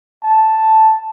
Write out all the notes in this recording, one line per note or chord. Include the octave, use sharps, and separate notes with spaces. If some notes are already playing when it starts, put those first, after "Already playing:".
A5